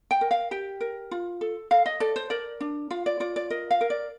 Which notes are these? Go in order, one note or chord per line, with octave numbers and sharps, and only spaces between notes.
G5
A#4
F5
G4 G5
A#4
F4
A4
A4 F5
D#5
A4 D5
C5
A#4 D5
D4
F4 F5
D5
F4 D5
D5
A#4 D#5
F5
A#4
D5